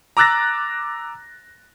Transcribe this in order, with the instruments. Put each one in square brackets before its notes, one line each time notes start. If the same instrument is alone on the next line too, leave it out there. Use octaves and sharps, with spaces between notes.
[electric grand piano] A#5 D6 E6 F#6 A6 A#6